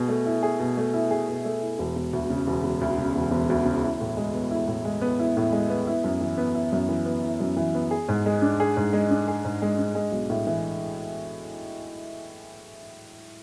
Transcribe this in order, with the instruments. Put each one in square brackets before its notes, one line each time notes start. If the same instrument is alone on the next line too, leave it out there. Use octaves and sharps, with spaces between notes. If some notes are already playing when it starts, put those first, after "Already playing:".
Already playing: [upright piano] B2 G#4
A3
E4
G#4
B2
A3
E4
G#4
B2
A3
E4
E1
E1
D2
C#3
E1
E1
D2
C#3
E1
E1
D2
C#3
E4
A2
G#3
B3
E4
A2
G#3
B3
E4
A2
G#3
B3
E4
F#2
E3
B3
E4
F#2
E3
B3
E4
F#2
E3
B3
G#4
G#2
G#3
D4
G#4
G#2
G#3
D4
G#4
G#2
G#3
D4
G#3
B1
A2
E3